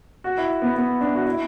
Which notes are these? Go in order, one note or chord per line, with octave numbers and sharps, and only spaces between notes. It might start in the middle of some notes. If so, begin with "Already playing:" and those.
F#4
E4
B3
B3
D4
F#4
E4